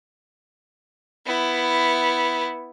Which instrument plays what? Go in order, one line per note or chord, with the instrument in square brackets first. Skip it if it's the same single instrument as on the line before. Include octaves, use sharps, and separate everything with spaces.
[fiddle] B3 E4